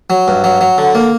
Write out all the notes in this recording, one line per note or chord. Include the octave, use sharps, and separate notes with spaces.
F#3
G2
F#3
F#3
D3
A#3